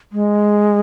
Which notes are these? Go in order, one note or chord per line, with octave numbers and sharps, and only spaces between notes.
G#3